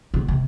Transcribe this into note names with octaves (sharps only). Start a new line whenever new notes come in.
B2
C3